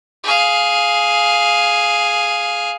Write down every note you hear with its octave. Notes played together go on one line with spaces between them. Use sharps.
G#4 F5